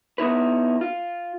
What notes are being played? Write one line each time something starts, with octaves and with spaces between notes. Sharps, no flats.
B3 D#4 E4 B4
F4